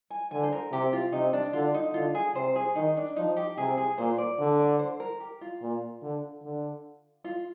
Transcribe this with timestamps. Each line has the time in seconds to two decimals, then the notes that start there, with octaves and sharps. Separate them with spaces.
0.10 G#5
0.31 D3 G#5
0.43 C5
0.52 A#4
0.72 C3 G4
0.93 F4
1.12 C3 D#4
1.33 D4
1.53 D3 F4
1.74 D#4
1.94 D3 F4
2.15 G#4
2.35 C3 C5
2.56 G#4
2.75 D#3 D#4
2.97 D4
3.16 F3 D#4
3.36 G4
3.58 C3 G#4
3.77 G#4
3.98 A#2 C5
4.18 D5
4.39 D3
4.59 D5
4.79 C5
5.00 A#4
5.20 G4
5.41 F4
5.62 A#2
6.02 D3
6.42 D3
7.24 F4